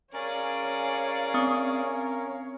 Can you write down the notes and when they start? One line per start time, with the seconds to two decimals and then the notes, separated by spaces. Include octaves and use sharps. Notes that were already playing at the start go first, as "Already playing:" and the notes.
0.13 C#4 G#4 A#4 C#5 D5 F5
1.34 C4 D#6